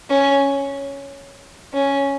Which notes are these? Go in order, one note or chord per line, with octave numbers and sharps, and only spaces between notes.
C#4
C#4